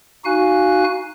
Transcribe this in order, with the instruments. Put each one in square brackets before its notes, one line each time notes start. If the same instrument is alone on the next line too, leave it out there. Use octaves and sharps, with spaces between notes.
[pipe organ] D#4 F#4 F5 G#5 F#6